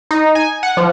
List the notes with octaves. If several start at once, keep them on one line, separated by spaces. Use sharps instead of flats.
D#4
G#5
F#5
F3